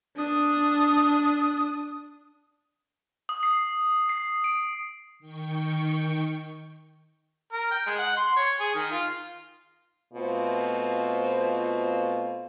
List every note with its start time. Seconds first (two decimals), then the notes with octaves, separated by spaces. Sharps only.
0.16 D4 D#6
3.29 D#6
3.43 C7
4.09 C7
4.44 D7
5.19 D#3 G5 C#6
7.53 A#4
7.71 G5
7.87 G#3
7.99 F#5
8.17 C6
8.37 C#5
8.60 G#4
8.75 D#3
8.92 F4
10.14 B2 A3 C4 F4